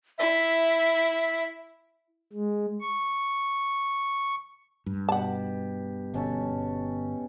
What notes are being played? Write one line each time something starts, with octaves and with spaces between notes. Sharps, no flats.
E4 E5
G#3
C#6
G2
B2 G4 F#5 A5
G1 B2 C#4 A4